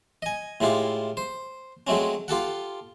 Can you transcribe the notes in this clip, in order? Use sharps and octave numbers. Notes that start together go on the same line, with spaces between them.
D#5 G#5
A2 G#3 E4 F4 G4
C5
F#3 G#3 A3 C4 C#4
F4 G4 A4 F#5